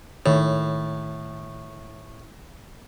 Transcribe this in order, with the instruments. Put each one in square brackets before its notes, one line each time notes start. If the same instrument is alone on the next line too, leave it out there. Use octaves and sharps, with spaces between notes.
[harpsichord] A2 [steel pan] D#3 C#5